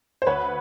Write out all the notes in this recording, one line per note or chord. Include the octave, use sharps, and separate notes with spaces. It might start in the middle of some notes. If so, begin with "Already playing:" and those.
C5
D2 B4 C#5